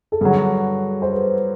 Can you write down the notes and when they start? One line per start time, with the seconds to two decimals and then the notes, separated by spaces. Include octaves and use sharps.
0.12 A4
0.21 G2 D3 F#3 G#4
1.02 C5
1.12 B4